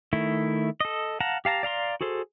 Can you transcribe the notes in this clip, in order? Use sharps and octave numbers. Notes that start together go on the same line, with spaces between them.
D#3 A3 E4
A4 D#5
F5 F#5 A5 A#5
G4 F5 A5 A#5
D5 F5 A#5 C6
F#4 G#4 A4 C5